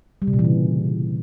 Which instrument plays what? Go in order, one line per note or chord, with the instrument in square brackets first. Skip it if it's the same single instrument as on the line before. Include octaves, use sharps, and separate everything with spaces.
[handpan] G3
C3
A#2
E3
C#3